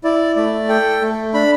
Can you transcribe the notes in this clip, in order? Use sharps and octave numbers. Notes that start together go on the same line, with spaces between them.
E4 D5
A3 D5
A4 G5
A3
D4 B5